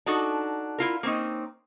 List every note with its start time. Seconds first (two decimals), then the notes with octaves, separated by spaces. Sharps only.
0.06 D4 D#4 F#4 A4
0.78 E4 F4 A#4
1.03 A#3 C4 C#4 D#4